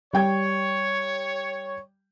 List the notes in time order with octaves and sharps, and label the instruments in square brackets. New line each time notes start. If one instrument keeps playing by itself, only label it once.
[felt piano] G3 G5 G#6 [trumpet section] C#5